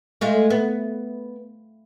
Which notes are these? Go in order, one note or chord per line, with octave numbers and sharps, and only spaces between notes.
G#3 A3 F4
B3